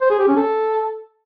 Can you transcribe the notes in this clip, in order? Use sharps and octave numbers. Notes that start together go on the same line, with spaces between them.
C5
G#4
G4
C#4
A4